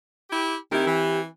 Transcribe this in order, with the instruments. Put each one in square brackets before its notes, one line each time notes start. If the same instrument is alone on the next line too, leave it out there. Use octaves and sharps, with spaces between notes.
[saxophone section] E4 G4
[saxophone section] D#3 E4 A#4 [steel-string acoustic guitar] C4 G4
[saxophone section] E3